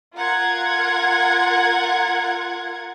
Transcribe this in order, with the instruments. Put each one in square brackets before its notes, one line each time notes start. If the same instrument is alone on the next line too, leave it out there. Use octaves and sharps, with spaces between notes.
[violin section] F4 A#4 F#5 G#6